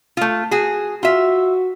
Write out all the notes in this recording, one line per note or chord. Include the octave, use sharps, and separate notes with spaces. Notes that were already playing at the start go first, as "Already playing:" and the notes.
A3 F4
F#4 G#4
F4 F#4 E5